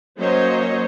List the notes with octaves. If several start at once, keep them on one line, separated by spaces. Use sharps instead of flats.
F#3 A#3 C#4 C5 C#5 D#5